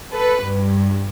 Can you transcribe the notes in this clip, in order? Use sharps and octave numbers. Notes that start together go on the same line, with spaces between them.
A4 B4
G2